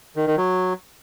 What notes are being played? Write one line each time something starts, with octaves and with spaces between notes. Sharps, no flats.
D#3
D#3
F#3